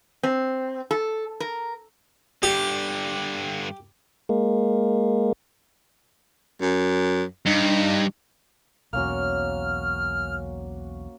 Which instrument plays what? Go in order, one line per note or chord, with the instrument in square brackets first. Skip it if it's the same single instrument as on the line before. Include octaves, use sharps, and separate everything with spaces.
[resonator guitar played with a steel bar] C4
A4
A#4
[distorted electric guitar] G2 D3 [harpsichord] G4
[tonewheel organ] G#3 A#3
[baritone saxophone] F#2
[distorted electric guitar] G2 [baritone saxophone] D#4
[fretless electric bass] B1 E2 [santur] A#3 C#4 F#4 [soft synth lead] F6